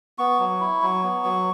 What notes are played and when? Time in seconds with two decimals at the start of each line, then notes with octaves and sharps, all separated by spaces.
0.18 B3 C#6
0.39 F#3
0.60 E4
0.82 F#3
1.03 B3
1.24 F#3